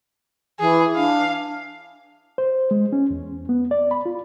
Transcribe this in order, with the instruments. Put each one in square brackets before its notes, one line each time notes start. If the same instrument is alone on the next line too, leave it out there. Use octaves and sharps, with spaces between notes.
[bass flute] E3 [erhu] G#4
[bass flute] D4 [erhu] F5
[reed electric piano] C5
G#3
C#4
E2
B3
D5
B5
F4